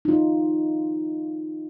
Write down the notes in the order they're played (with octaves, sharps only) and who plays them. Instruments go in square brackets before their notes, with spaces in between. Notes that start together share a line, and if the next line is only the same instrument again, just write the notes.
[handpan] D#4 F4